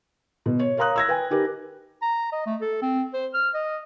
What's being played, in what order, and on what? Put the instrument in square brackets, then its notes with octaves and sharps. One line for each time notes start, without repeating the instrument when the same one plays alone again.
[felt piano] B2
C#5
A#4 C#5 F5 A#5 D#6 F#6
E6 G#6 A#6
B4 G5 G#5
D#4 G4 A#4 B4
[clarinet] A#5
D#5
A3
A4
C4
C5
F6
D#5